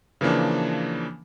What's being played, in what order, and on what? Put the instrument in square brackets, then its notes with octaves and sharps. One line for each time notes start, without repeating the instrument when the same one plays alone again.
[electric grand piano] C#3 E3 F3 A#3 D4